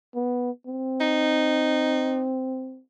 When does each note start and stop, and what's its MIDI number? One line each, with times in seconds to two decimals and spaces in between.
0.15 0.51 59
0.67 2.81 60
1.01 2.32 63